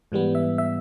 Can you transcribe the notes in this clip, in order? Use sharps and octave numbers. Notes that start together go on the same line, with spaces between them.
G#2 E3 G3 B3
E5
E5